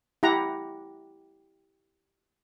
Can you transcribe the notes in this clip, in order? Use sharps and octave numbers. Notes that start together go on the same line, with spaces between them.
E4 G4 F#5 A#5